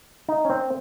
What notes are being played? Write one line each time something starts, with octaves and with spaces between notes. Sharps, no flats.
D#4
C#4
C4